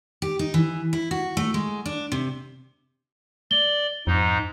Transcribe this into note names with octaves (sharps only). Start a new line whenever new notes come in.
G4
D#4
E3
E4
F#4
A3
G#3
D4
C3
D5 G7
F2 G#2 D#4